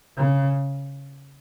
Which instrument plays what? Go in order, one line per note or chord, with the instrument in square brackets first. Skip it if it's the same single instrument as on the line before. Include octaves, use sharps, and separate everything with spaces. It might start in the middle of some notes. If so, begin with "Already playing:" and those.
[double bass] C#3